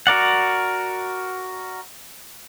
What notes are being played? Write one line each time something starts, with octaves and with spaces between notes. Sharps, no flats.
F#4 A#4 D5 F#5